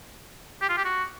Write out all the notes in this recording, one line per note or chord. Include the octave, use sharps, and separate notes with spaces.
G4
F4
G4
F#4